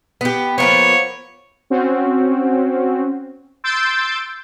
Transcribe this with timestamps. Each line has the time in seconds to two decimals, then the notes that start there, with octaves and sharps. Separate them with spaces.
0.21 B3 G4
0.58 F3 A#3 B3 C#5
1.70 C4 C#4 F#4
3.64 C6 E6 G6 A6 D7